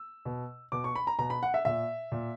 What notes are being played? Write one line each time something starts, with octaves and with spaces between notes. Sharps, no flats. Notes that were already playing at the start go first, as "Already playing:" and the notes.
Already playing: E6
B2
B2 D6
C#6
B5
A#5
B2 A#5
B5
F#5
E5
A#2 E5
A#2